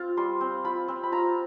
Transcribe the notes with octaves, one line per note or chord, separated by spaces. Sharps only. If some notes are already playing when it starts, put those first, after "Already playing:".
Already playing: C4 F4
G3 C6
C4
F4 B5
C4
B5
F4 A#5